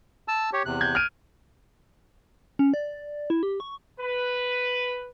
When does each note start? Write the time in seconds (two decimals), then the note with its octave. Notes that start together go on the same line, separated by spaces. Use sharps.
0.28 A5 E6
0.53 G4 C#5
0.65 E2 C3 F#6
0.81 G6 G#6
0.95 F6 D7 D#7
2.59 C#4
2.74 D5
3.30 E4
3.43 G4
3.60 C#6
4.00 B4